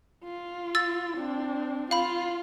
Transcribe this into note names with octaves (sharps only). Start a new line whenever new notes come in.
F4
E6 A6
C4 D4
F4 F5 B5